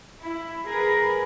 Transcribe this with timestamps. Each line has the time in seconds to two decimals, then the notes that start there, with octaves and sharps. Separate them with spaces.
0.20 E4
0.67 G#4 A#4 B4